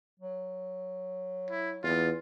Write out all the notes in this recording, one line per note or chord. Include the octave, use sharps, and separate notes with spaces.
F#3
E4
E2 F4